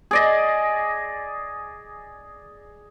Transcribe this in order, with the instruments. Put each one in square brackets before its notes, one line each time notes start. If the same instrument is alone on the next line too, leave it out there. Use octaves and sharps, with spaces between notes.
[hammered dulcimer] G#4 D5 D#5